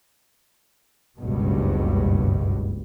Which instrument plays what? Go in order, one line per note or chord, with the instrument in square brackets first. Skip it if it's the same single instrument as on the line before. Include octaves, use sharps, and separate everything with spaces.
[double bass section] F#1 C#2 G2 B2